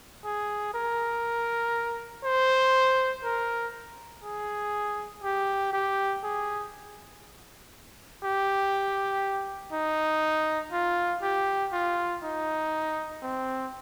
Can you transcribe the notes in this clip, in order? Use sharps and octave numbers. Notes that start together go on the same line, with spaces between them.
G#4
A#4
C5
A#4
G#4
G4
G4
G#4
G4
D#4
F4
G4
F4
D#4
C4